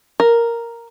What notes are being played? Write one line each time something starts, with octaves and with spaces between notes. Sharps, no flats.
A#4